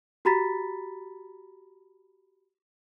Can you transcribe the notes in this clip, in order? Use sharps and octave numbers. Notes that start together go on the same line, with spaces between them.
F#4 G4 A#5 B5 A6 B6